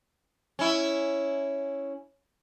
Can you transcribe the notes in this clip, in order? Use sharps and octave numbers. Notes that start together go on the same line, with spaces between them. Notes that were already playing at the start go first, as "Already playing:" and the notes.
C#4 E4